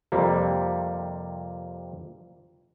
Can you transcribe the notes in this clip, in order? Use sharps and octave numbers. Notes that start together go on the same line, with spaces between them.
F2 C3 G3 A#3